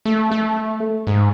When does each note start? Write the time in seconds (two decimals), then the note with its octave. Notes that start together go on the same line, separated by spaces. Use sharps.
0.05 A3
0.31 A3
1.07 G#2